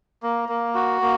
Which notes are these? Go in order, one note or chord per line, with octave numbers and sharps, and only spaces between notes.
A#3
A#3
F#4
A#3